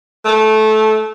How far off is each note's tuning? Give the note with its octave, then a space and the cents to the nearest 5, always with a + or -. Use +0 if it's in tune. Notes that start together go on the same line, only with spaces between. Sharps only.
A3 -15